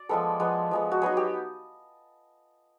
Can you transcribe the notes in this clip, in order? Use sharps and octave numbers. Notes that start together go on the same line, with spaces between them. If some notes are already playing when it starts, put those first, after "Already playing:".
Already playing: D5
F3 G#3 B3 A4
F3 G#3 B3
F3 G#3 B3
F#4
F#3 B3 D#4 G#4
G4